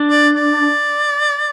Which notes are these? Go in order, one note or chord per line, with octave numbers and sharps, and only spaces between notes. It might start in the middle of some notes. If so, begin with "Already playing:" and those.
Already playing: D4
D5
D5